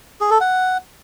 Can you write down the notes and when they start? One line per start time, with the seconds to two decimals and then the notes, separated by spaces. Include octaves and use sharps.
0.21 G#4
0.31 A4
0.40 F#5